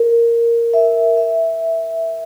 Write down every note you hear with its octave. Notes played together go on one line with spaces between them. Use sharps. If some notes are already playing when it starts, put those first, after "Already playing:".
Already playing: A#4
E5
E5